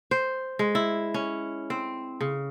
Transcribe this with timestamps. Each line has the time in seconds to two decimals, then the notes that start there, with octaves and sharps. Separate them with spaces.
0.11 C5
0.59 G#3
0.75 E4
1.14 C#4
1.70 C4
2.21 C#3